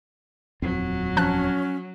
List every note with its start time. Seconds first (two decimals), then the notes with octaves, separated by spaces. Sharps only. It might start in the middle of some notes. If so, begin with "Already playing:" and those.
0.62 D#1 F2 F#3 C4
1.17 F3 C#4 A5 F#6